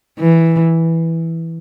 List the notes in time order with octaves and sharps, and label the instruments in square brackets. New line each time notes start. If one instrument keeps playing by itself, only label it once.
[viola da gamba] E3